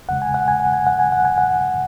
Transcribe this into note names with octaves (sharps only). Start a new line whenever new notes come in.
E2 C#3 G#3 F#5
G#5
F#5
G#5
F#5
G#5
F#5
G#5
F#5
G#5
F#5